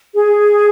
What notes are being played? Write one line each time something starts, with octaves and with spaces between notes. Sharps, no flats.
G#4